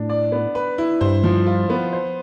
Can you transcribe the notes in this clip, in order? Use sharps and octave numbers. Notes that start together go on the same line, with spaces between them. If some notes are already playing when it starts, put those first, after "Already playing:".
Already playing: A2 D4
D5
B3
B4
E4
G2 C5
F3
F4
B3
C5